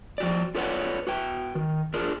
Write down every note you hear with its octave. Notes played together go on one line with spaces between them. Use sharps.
F3 F#4 D5
F4 A4 B4 C#5 D5 F#5
F#4 B4 G5
D#3
D4 F4 G#4 A#4